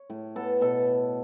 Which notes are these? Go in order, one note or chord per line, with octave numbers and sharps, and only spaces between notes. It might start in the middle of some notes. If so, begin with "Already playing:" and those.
Already playing: C#5
A2
B3 A4
B2 A4